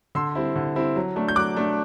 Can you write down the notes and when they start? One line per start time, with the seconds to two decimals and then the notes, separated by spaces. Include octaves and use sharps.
0.15 D3 C6 E6
0.35 G3 C4 E4
0.56 D3
0.76 G3 C4 E4
0.96 F#3
1.16 A3 D4
1.28 G6
1.36 F#3 D6 F#6
1.56 A3 D4